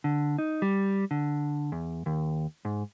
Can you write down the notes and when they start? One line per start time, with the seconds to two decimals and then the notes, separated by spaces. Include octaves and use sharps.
0.04 D3
0.38 D#4
0.62 G3
1.11 D3
1.72 E2
2.06 D#2
2.65 G#2